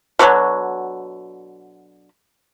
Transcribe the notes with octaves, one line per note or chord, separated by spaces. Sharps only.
B2 D3 E3 F#3